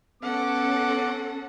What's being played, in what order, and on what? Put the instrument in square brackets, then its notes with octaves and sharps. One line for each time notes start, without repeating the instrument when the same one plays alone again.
[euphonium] B3 [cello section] C#4 A4 [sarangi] F#5 [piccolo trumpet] D6